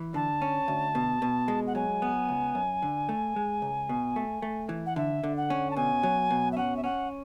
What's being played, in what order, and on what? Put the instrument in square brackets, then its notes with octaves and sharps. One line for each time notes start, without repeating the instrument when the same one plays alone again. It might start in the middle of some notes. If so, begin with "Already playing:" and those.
Already playing: [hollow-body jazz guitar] E3
[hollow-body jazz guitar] D3 [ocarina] A5
[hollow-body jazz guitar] C#4
D2
B2
B2
G#3
[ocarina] F#5
[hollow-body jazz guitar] F#3 [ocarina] G#5
[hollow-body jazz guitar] B3
C#2
F#2
D3
A3
G#3
C#2
B2
A3
A3
E3
[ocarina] F#5
[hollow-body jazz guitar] D3 [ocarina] E5
[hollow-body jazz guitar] D3
[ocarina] F#5
[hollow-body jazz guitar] C#4
[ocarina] A5
[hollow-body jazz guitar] B2 [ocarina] G#5
[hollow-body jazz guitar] F#3
B2
[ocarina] E5
[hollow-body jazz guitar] C#4 [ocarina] F#5
[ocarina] E5
[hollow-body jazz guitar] C#4 [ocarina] F#5